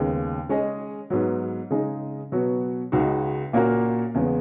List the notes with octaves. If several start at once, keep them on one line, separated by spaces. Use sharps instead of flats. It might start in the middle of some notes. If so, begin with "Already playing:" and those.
Already playing: D#2 C#3 G#3 B3
G#3 C#4 G#4 D#5
G#2 F#3 B3
C#3 G#3 D#4 G#4 D#5
B2 F#3 B3 F#4
C#2 C#3 G#3 D#4 F#4
A#2 A#3 C#4 F#4 A#4
E2 C#3 G#3 B3